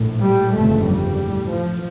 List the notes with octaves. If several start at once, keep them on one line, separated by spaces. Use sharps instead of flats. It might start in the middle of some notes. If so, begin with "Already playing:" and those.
Already playing: A#1 A2
G3
G1 F2 C#3 A3
G3
A1 A2
F3